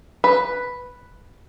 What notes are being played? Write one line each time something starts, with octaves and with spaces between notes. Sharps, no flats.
B4